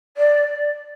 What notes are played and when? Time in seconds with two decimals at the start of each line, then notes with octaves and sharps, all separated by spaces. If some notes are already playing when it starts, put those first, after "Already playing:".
0.17 D5